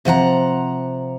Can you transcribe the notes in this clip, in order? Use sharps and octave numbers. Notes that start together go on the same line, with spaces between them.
C3 F3 F#5 A#5